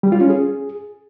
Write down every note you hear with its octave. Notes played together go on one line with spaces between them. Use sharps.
G3
F4
C#4
G#4